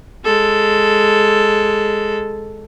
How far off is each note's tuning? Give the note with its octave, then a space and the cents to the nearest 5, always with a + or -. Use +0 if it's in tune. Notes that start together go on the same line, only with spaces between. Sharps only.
G#3 +0 A4 +0